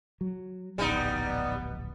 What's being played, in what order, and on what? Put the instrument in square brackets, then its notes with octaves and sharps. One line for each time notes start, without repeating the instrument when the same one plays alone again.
[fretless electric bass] F#3
[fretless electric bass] D1 A#1 [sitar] G3 D#4 [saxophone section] B3